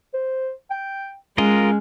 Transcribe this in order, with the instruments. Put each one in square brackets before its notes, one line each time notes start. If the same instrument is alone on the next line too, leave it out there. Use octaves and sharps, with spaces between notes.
[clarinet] C5
G5
[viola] G#3 [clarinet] C#4 [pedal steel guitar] F4 A#4 D#5